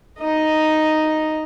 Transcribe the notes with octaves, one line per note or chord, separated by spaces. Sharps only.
D#4 D#5